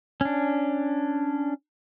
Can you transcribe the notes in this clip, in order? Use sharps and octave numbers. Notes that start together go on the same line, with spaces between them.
C#4 D4